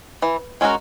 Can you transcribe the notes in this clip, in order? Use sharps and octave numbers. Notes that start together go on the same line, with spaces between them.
E3
G#3 C#4 F#4 A#4